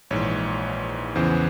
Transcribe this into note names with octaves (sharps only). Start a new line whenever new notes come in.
A#1 G#2 E3 C#5
E2 C#3 E3 C5